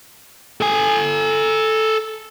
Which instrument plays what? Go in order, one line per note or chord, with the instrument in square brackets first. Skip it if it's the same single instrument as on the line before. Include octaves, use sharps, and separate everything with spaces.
[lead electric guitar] A4 G#5